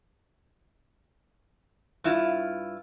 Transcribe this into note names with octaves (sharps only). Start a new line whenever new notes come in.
G2 E4 F4